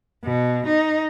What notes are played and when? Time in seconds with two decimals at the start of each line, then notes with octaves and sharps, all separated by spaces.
0.24 B2
0.66 D#4